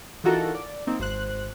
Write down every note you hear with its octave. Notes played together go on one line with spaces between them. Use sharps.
E3 D#4 F4 F#4 A4 A#4
D5
A#3 C4 D#4
G#1 C5 F#6